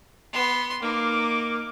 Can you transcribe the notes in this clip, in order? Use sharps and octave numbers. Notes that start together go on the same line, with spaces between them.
B3 C6
A#3 D#4 D6